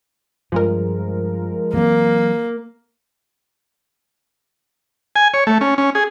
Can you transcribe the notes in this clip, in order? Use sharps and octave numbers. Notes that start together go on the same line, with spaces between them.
G2 F3 G#3 A#4
E3 F#3 A#3 C4
G#5
C#5
A3
C#4
C#4
G#4